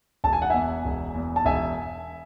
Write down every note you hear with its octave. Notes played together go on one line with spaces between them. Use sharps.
E1 A5
G#5
F#5
E2 E5 G#5
E1
E2
A5
E1 E5 G#5